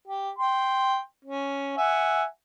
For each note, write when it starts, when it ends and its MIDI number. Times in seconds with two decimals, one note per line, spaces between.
0.07 0.30 67
0.38 0.99 79
0.38 0.99 84
1.24 1.72 61
1.77 2.24 76
1.77 2.24 78
1.77 2.24 80